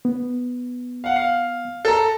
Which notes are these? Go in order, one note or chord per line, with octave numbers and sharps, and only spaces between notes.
B3
F5 F#5
F5
A4 A#5